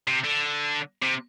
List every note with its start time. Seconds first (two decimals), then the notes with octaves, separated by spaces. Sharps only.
0.07 C3
0.24 D3
1.02 C3